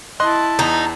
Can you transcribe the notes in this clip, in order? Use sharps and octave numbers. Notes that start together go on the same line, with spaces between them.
E4 D#5 A5 C6 F#6
E2 D#4